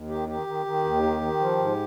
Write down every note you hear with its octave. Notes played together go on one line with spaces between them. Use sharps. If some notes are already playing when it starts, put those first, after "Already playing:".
Already playing: D#2
D#3 G4
D#3 G4
D#3
D#3
D#2
D#3
D#3
F3
G#2